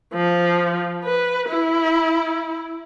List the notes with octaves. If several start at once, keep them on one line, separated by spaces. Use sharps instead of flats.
F3
B4
E4